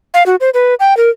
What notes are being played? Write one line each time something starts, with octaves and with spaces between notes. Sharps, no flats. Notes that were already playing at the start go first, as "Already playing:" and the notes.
F5
F#4
C5
B4
G5
A#4